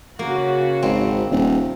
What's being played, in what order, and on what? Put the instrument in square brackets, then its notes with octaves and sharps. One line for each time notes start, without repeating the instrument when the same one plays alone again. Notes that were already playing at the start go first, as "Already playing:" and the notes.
[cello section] C#3 C#4 F#4 [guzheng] A#3
[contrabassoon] G#1 [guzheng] C4
[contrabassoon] D#1 [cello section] C3 D#3